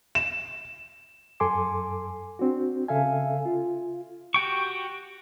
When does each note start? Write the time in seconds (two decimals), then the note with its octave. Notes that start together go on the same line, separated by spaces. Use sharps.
0.15 E7
1.40 F#2 A4 G#5 C6 D6
2.39 C4 D4 F#4
2.88 C#3 A4 E5 F5 G#5
3.46 F4
4.34 F#4 G4 G5 C#6